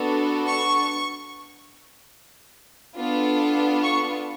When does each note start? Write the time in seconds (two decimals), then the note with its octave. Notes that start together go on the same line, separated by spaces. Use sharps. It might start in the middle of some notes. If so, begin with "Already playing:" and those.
Already playing: B3 D4 F#4 A4
0.47 C#6
2.98 B3 D4 F4 A4
3.82 C#6